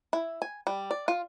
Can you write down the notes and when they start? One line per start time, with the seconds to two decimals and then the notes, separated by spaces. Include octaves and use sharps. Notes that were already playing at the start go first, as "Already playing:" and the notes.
0.13 E4
0.42 G#5
0.67 G3
0.91 D5
1.08 F4